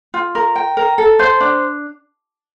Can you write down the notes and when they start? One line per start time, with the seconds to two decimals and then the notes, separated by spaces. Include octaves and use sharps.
0.14 F4
0.35 A#4
0.55 G5
0.77 A#4
0.98 A4
1.19 C5
1.40 D4